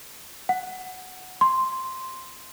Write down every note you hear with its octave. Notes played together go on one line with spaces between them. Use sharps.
F#5
C6